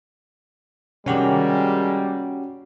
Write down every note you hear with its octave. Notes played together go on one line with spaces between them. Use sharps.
C3 D#3 G3 G#3 A#3 C#4 F#4 G4